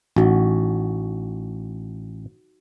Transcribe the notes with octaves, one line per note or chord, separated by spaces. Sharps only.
A1 D#4 F#4